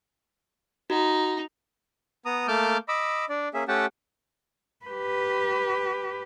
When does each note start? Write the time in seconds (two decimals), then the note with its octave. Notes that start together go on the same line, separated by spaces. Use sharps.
0.90 D#4 F#4
2.26 B3 A#5 D#6
2.48 A3 A#3 A5 D6 F6 G6
2.88 D#5 B5 D6 E6
3.29 D4 D5
3.54 A#3 C#4 G#4 E5
3.68 A3 C#4 G4 F#5 G5 A5
4.86 G4 B4